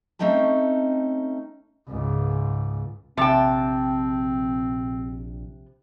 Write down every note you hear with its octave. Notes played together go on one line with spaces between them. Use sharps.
A3 C4 C#4 D#4 G5 A5
C#2 G#2
A#1 C3 C4 G5 A5